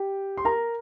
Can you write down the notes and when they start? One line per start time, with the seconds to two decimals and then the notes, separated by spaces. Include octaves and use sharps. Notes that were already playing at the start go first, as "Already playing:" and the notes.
Already playing: G4 G5
0.37 C6
0.45 A#4 A#5